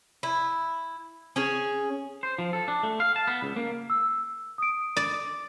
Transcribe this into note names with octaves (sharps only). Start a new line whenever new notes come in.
E4
C#4 G#4 C#5
C5
F3
A4
D4
A3
F5
A5
B3
C#2
A#3
E6
D#6 D7
D5